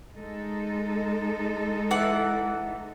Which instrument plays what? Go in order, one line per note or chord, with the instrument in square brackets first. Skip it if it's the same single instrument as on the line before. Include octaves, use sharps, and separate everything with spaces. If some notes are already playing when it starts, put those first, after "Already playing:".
[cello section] G#3 D#4 A4
[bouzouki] E3 F#5